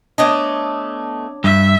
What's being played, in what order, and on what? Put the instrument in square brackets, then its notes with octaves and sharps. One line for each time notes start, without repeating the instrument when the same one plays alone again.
[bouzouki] A3 B3 D#5 [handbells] D4 C#5 D6
[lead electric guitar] G2 [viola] E5